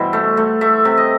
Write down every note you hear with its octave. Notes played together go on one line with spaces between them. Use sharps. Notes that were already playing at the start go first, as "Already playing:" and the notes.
Already playing: G2 B2 E3 C5
A3
A3
A3 E5
C3
D#5